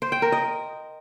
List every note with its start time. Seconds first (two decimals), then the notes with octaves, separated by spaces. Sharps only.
0.02 C5
0.12 G5
0.22 A#4
0.32 D#5